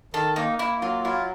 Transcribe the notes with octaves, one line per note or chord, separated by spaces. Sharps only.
D#3 A4
A#3 D#4
A#3 E4
F#3 F4
E4 F4